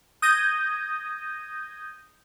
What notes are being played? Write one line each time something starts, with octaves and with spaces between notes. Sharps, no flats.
D#6 G6 G#6 A#6 D#7